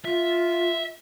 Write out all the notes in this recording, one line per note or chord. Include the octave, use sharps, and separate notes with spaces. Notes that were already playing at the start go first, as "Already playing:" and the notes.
F4 E5